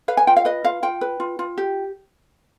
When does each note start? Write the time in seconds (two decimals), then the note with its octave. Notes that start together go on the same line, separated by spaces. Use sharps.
0.08 B4 F5
0.17 G#5
0.27 F4 G5
0.37 F5
0.45 B4 D#5
0.64 F4 F5
0.83 F4 G5
1.01 B4
1.20 F4
1.39 F4
1.58 G4